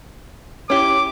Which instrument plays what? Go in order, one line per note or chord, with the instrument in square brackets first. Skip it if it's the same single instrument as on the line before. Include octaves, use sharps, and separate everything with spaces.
[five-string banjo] C#4 E4 G4 [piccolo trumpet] D6